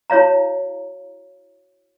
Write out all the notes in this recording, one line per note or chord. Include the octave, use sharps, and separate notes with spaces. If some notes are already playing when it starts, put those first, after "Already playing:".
E4 F#4 C#5 F5 A#5